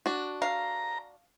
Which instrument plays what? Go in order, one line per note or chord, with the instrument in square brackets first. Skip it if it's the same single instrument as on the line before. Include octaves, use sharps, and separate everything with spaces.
[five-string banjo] D4 F#4
[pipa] F5 [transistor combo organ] A#5